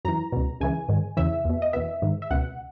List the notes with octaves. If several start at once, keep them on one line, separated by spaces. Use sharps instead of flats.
F#2 E3 A#5
C#2 B2
C#2 C#3 E3 G#5
G#2 D#3
E2 C#3 E3 E5
E2 B2
D#5
E2 B2 E5
G#2 D#3
E5
C#2 B2 F#5